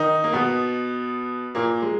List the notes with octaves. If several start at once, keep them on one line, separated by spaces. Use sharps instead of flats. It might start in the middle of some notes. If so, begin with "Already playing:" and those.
Already playing: D#3 D#4
A#3
B2 B3
A#2 A#3
G#3